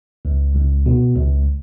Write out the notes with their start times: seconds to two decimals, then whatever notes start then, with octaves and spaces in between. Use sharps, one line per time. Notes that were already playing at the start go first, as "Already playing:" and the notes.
0.25 C#2
0.56 C#2
0.86 B2
1.16 C#2